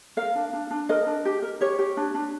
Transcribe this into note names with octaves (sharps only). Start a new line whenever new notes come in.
A#4 F5
D4
D4
D4
A#4 D#5
D4
G4
A#4
G4 C#5
G4
D4
D4